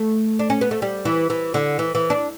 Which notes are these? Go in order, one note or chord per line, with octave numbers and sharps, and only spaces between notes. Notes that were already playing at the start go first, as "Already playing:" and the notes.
Already playing: A3
D4
C#4
B3
A3
G3
E3
E3
D3
E3
E3
D4